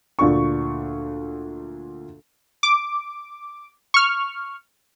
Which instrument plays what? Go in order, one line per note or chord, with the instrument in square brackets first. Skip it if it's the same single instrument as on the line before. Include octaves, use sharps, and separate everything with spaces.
[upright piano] D2 A#2 D4 C#6
[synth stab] D6
C#6 F6